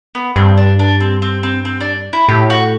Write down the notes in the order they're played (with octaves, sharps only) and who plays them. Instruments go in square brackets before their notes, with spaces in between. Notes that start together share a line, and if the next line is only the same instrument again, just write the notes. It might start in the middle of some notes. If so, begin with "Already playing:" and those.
[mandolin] B3
[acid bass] G2 [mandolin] C4
[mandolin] D4
D4
C4
C4
C4
C4
D4
E4
[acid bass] A2 [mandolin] G4
[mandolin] F#4